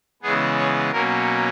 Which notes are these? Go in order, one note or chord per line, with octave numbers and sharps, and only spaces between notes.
C#3 E3 G#3 B3 G#4
C#5
B2 F#3 A#3 C#4 A#4